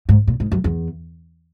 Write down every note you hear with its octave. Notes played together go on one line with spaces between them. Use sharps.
G#2
A#2
G#2
F#2
E2